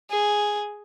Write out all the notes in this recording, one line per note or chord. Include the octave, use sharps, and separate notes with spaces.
G#4